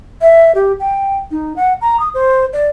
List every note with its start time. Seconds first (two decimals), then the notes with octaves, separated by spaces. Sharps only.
0.21 E5
0.55 G4
0.80 G5
1.31 D#4
1.56 F#5
1.81 A#5
2.00 D#6
2.14 C5
2.53 D5